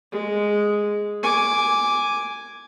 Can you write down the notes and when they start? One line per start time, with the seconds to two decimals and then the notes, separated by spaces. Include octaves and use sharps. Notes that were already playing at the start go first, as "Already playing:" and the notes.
0.12 G#3
1.23 G#5 D6